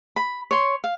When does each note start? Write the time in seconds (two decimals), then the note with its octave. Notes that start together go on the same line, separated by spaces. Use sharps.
0.16 B5
0.51 C#5 C6
0.84 F5